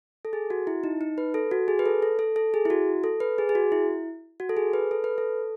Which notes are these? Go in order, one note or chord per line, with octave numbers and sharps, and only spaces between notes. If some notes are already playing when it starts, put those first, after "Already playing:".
A4
G#4
F#4
E4
D#4
D#4
B4
A4
F#4
G#4
B4
A4
A4
A4
A4
G#4
E4
F#4
A4
B4
G#4
G#4
F#4
E4
F#4
A4
G#4
B4
A4
B4
A4